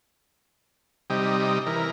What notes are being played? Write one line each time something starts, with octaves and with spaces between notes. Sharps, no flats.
C3 G3 D#4
E3 A#4